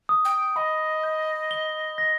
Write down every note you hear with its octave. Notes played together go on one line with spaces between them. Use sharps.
D#6
G5
D#5 B5
G6
G7
A#6